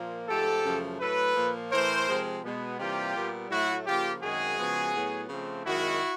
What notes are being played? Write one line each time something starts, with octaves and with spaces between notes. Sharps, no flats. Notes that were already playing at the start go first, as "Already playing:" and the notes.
Already playing: A#2 F3 A#3
G#2 F3 A3 G4 A4
F#2 C#3 F3 A3
A2 F#3 A3 A4 B4
A#2 F3 A#3
A2 E3 A3 A#4 C5
C3 F3 G#3 C4
B2 G#3 B3
C3 E3 G3 A#3 F4 G4
A#2 G3 B3
A2 F#3 A3 E4 F#4
C#3 F3 A#3 F4 G4
F#2 D#3 G#3 C4 F#4 G#4
C#3 F3 G#3 B3
A2 F#3 B3
C#3 F3 A3 C4
F#2 D#3 G#3 E4 F#4